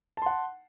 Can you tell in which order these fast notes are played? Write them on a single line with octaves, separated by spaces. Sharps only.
A5 C6 F#5